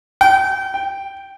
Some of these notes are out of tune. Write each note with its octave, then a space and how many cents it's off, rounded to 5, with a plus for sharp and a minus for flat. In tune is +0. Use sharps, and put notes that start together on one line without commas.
G5 -30
G5 +0